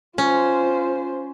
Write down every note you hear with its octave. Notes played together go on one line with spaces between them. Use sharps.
C#4 F4 C5